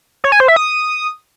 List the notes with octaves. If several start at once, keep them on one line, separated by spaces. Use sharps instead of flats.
C#5
G#5
C5
E5
D#6